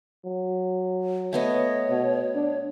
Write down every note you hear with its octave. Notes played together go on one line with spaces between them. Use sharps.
F#3
A3 B3 C#5 D#5
B2
D4